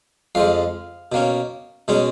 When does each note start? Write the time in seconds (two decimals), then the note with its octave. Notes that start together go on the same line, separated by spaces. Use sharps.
0.35 F2 F3 G#3 F5
1.12 B2 A#3 C#4
1.88 B2 G#3 C#4